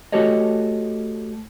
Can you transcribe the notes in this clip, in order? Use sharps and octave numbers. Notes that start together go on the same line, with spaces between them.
A3 F#4 G4 A4 C#5 D#5